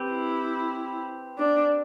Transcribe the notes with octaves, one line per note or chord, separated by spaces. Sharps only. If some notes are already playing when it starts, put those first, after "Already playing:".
Already playing: C4 G4 B4
E4
D4